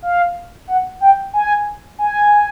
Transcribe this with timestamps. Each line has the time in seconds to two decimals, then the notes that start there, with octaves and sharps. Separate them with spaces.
0.02 F5
0.67 F#5
1.01 G5
1.33 G#5
1.98 G#5